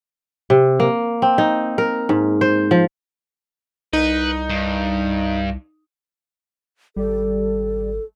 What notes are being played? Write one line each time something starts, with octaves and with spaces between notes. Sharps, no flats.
C3
A#3
C4
D#4
A#4
G#2
C5
F3
C2 D#4 B4
G2
G#1 G3 G4 A4 D5